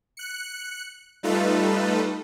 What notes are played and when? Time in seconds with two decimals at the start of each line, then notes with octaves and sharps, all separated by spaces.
0.17 F#6 C#7
1.23 G3 A3 D#4 F4 A4 B4